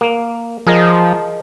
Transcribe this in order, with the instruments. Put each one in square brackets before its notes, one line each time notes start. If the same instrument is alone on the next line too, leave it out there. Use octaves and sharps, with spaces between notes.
[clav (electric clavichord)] A#3
[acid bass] F3 [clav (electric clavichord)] G#4 A#4 D#5